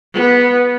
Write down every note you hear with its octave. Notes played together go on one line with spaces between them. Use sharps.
B3